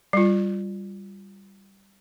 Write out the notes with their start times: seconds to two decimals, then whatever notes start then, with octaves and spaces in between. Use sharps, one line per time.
0.13 G3 F4